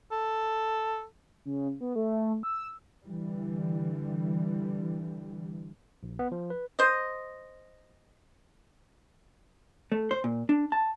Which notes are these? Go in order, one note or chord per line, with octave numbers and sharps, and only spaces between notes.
A4
C#3
B3
A3
E6
D3 E3 G3
A#1
B3
F3
B4
C5 D#5
A3
C5
A#2
D4
A5